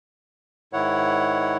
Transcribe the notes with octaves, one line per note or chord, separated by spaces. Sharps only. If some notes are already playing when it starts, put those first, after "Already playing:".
G#2 D#3 E4 C#5 F#5